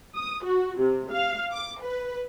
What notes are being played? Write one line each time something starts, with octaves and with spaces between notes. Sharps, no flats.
D#6
F#4
C3
F5
D6
B4